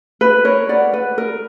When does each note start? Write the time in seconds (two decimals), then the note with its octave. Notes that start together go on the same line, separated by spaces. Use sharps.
0.21 B4
0.45 A#4 C#5
0.69 D5 F#5
0.94 B4
1.18 A#4